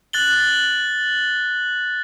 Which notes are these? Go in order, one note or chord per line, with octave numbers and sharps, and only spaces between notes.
F#6 A6 F#7 G7